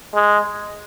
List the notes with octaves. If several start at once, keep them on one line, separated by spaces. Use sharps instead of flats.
G#3